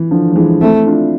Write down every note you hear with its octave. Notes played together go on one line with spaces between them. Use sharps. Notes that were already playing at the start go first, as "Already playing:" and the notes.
Already playing: E3
D3 F3
F3
E3 G#3
A3 C4 E4
D4 F4